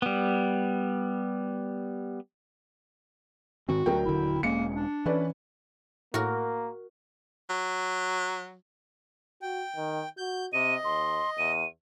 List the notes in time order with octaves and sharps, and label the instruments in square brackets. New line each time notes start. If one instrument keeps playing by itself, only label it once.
[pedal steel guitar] G3 B3
[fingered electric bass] G#2 D#3 C4 [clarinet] F#4
[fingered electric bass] D2 [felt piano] F#3 A#4 G5
[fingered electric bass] D#1 D3 [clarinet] E4
[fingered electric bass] E1 G#3 C#4 [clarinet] A#3 [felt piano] C#7
[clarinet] D4
[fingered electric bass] E3 [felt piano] C#4 B4 D5
[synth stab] A2 [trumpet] A#3 [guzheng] F#4 A#4
[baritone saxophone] F#3
[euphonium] F#4 [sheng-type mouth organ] G5
[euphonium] D#3
[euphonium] F#4 [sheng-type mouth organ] G6
[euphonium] C3 [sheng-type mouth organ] D#5 [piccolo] D#7
[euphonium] D#2 [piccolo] C6
[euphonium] E2 [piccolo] D#7